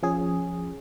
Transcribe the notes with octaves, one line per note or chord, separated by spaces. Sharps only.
F3 C#4 G#4